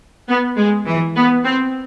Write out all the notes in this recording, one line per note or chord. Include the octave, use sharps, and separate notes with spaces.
B3
G#3
E3
B3
C4